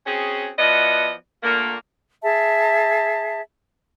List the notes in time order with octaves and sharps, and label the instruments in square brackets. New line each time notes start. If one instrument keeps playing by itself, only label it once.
[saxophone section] C4 C#4 F#4 G#4
F3 B3 E4 F#4 D5 D#5
A#2 D3 A3 A#3
[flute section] G#4 E5 A5